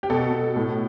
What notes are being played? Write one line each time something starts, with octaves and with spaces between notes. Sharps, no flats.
G4
B2 A4
B2
A2